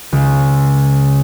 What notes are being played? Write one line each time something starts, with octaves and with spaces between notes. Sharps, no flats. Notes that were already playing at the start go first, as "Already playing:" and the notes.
C#2